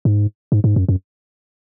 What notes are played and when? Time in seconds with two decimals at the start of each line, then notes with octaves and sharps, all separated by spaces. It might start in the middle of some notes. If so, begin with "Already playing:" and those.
0.05 G#2
0.52 G#2
0.64 G#2
0.76 F#2
0.89 F#2